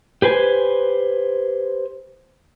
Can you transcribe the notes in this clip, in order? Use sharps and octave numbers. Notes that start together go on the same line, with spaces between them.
G4 B4 C5 G#5